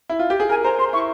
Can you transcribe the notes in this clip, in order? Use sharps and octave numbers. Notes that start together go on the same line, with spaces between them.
E4
F4
G4
G#4
A#4 G#5
C5 A#5
C5 C6
E4 C#6